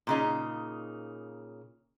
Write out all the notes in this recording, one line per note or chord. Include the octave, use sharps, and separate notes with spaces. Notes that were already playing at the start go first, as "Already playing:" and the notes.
A#2 C#3 D#4